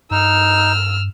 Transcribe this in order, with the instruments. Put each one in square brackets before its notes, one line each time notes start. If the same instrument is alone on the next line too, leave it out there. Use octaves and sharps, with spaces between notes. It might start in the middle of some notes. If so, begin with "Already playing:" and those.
[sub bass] G2 [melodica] D#4 [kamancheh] E6 F6